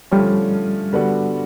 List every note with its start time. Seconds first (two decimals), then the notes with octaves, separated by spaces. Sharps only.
0.11 D3 F3 G3 A3 C#4
0.93 D3 G3 B3 D4 F#4